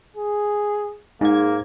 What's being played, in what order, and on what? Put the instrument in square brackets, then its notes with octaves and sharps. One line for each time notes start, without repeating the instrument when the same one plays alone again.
[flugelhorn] G#4
[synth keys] G#2 G#6 [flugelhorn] A#3